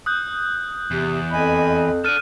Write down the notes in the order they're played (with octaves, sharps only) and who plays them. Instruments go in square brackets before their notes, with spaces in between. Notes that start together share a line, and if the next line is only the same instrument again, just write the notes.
[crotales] D#6 F#6 G6
[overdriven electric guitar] E2 [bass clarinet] C3
[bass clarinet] F2 [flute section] D#5 G#5 B5
[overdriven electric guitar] A4 D5 [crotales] F6 F#6 D#7